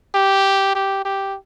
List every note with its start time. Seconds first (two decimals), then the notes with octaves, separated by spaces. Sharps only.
0.14 G4
0.75 G4
1.05 G4